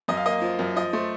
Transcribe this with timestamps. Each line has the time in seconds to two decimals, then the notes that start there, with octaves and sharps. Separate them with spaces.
0.08 F#2 D#5
0.17 F5
0.26 A#3 D#5
0.42 F3
0.59 F#2
0.76 F3 D#5
0.93 A3 C5